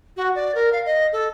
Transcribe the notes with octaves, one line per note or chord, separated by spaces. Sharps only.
F#4
D5
A#4
F5
D#5
A4